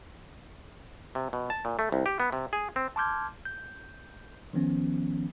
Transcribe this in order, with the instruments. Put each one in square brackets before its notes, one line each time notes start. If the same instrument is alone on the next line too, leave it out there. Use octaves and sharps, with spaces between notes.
[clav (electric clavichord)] C3
B2
A5
A#2
A3
C2
G4
B3
C3
G#4
C4
[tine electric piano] A5 C6 D6 F6 G6 G#6
G6
D#3 F3 B3 C#4